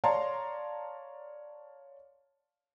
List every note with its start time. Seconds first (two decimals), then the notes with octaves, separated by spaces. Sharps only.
0.04 C#5 D5 F5 A5 A#5 C6